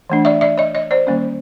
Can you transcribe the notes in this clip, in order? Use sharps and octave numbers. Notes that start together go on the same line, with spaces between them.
E3 A3 D4
D5 E5
D5 E5
C#5 D#5
C#5 D#5
C5 D5
D#3 G3 A#3 C#4